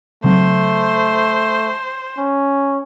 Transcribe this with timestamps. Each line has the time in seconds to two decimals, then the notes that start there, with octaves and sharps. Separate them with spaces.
0.24 C#3 F#3 A3 C4 C5
2.18 C#4